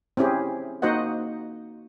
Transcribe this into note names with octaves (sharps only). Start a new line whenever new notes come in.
C4 C#4 E4 G4 G#4
A#3 D#4 F#4 C5 D#5 F#5